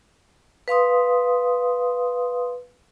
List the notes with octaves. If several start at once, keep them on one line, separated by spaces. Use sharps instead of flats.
B4 F5 C6 D#6